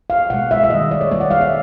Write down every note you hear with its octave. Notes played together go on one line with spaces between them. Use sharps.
F5
B2 G#3 F#5
E5
E5
D#3 G3 A#3 D#5
D5
C#5
D#3 G3 A#3 D5
F#5
F5
E5